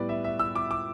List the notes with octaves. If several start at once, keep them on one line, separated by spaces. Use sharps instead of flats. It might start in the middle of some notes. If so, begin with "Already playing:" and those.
Already playing: A2 G3 B3 B4 D5
E5
E5
E6
D6
D6